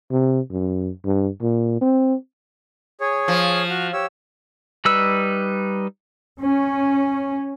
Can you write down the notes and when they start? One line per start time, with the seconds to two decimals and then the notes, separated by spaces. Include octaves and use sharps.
0.11 C3
0.51 F#2
1.05 G2
1.42 A#2
1.81 C4
3.01 G#4 C#5
3.28 F3
3.69 F#4 F6
3.93 G4 C#5 E6
4.85 G3 D#4 B4 E6
6.41 C#4